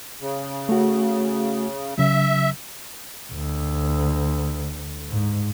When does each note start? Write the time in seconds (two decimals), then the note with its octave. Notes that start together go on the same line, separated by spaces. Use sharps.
0.21 C#3
0.69 A3 F#4
1.98 C#3 F#3 E5
3.32 D2
5.09 G#2